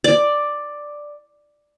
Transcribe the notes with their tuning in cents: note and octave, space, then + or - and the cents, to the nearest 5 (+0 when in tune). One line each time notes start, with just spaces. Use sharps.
D5 +5